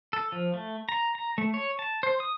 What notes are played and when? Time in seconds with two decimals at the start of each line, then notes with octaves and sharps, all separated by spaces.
0.13 A4
0.32 F3
0.54 A3
0.89 A#5
1.15 A#5
1.38 A3
1.54 C#5
1.79 A5
2.03 C5
2.20 D#6